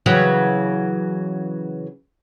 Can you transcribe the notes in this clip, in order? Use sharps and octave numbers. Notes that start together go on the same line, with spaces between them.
C#3 E3 F#3